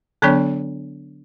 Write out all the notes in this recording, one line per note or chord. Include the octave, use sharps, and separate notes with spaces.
D3 F#3 B3 D4 C#5